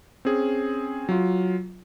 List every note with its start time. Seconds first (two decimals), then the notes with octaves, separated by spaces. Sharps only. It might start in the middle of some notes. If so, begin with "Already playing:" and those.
0.25 C4 C#4 G#4
1.09 F#3 F4